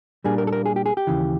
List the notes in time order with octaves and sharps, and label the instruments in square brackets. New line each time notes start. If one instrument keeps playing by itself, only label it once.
[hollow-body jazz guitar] A#2 G3 A#3 D4 G#4
A#4
A4
A#4
G#4
G4
G#4
G4
D#2 C#3 E3